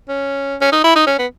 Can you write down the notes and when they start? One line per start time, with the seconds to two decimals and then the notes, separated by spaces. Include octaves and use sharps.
0.09 C#4
0.61 C#4
0.72 D#4
0.84 E4
0.95 D#4
1.07 C#4
1.19 B3